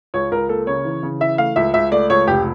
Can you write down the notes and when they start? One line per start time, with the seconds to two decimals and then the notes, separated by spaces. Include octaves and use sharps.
0.14 C#2 C#5
0.32 C#2 A#4
0.49 A#3 A4
0.67 C#3 C#5
0.85 E3
1.03 C#3
1.20 E3 E5
1.38 A3 F5
1.56 C#2 E5
1.74 C#2 E5
1.92 A3 D5
2.10 C#2 C#5
2.27 F1 G4